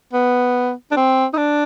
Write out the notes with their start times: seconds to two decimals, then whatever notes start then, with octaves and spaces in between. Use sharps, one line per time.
0.13 B3
0.91 D4
0.96 C4
1.33 D#4
1.37 D4